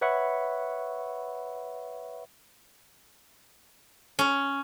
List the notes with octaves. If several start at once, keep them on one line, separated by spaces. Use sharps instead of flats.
B4 C#5 E5 F#5 B5 C#6
C#4